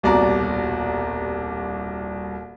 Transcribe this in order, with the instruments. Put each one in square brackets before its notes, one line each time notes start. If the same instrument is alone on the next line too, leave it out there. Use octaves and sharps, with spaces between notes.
[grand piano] D#1 C2 B2 F#4 D5 A#5